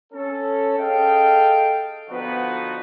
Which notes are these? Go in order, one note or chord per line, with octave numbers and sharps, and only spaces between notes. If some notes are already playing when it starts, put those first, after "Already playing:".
C#4 A4
G#4 A4 D#5 F5 G5
D3 F3 B3 D#4 F#4 B4